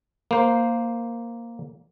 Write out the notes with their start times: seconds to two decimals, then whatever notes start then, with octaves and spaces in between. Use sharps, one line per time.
0.31 A#3 C5